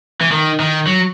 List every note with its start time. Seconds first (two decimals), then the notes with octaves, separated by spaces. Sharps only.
0.21 E3
0.31 D#3
0.60 D#3
0.87 F#3